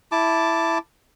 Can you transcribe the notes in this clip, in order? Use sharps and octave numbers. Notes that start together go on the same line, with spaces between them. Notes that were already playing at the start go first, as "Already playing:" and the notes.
E4 A5 D6